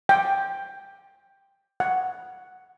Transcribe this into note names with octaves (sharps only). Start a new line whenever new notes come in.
G5
F#5